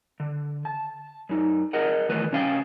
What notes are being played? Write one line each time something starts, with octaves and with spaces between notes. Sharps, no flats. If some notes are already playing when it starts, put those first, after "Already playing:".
D3
A5
F#2 D#4
G#4 A#4 D#5 F#5
E2 D#3 F#3 A3 B4
C3 C#4 F5 G5